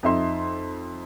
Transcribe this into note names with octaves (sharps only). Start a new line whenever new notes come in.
F2 D#4 E5 C6